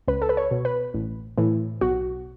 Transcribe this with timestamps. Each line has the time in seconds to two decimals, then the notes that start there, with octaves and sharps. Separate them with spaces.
0.08 C#2 B4
0.22 A4
0.29 B4
0.37 C#5
0.51 B2
0.65 B4
0.94 A1
1.38 A2 E3
1.81 B1 F#4